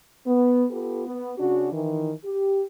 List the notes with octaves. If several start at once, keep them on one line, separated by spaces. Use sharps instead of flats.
B3
B3 F4 G4 A4 B4
B3
C#3 C#4 D4 F#4
D#3 E3
G4